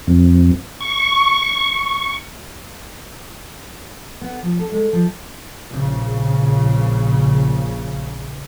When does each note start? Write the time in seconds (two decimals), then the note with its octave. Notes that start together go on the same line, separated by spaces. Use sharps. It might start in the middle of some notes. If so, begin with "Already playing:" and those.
0.07 F2
0.81 C#6
4.21 B3
4.43 F3
4.59 A4
4.72 G#3
4.93 F3
5.71 A#1 C#3